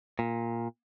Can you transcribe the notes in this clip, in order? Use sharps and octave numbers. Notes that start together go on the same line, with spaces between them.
A#2